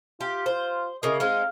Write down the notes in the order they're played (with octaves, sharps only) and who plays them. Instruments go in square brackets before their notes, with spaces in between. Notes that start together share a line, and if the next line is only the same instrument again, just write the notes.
[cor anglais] F4 [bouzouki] G4
[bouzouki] C5
[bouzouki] C#3 A#3 [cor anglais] D#5
[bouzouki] G#3 C4 D#4 [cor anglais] F5